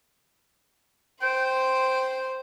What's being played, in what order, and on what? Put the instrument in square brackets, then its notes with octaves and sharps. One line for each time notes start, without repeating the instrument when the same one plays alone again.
[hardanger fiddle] C5 C6 [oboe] G5